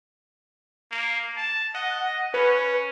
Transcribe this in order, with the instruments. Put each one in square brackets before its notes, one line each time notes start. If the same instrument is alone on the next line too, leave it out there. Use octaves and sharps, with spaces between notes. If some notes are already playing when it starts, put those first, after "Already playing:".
[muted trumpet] A#3
A5
[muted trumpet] D#5 [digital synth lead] F#5
[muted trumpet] C#4 [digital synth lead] B4